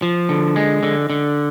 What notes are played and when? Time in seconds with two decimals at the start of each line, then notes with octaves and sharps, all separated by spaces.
0.02 F3
0.29 D3
0.56 G#3
0.83 D3
1.10 D3